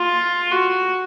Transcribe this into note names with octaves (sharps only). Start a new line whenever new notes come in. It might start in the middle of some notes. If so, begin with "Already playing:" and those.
Already playing: F4
F#4